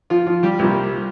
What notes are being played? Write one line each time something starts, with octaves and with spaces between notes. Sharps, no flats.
F3 F4
F3 F4
G3 G4
C2 A#2 G3 A#3